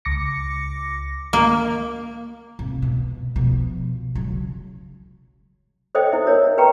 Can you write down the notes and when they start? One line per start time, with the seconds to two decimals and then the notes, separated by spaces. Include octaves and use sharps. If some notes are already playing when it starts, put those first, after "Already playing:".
0.05 C#2 D6 A#6 C#7
1.33 A#3
2.59 C3
2.82 B2
3.36 B2 F3
4.15 C#3 F#3
5.95 A4 C5 C#5 D#5 G5
6.11 E4 E5
6.26 G4 A#4 C#5 D#5
6.57 G4 B4 G5 A#5 C#6